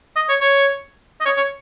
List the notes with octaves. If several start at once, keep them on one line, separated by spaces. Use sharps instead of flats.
D#5
C#5
C#5
D#5
C#5
C#5